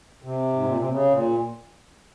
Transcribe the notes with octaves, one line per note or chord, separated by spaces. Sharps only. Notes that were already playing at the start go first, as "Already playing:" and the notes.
C3
G#2
A#2
C3
C#3
A#2